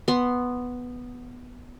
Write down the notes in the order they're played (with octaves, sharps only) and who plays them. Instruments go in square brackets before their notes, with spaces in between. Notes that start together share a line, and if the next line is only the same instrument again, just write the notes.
[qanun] B3 C6